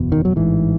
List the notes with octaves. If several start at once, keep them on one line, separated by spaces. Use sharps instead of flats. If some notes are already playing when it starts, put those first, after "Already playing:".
Already playing: F#1 E2 B2
D#3
F#3
A1 G#2 E3